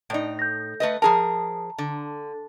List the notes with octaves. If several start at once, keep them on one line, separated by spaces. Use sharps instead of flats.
A2 D#4 D5 D7
G6 A#6
A3 B4 D#5
F3 G#4 A#4 A5 A#5
D3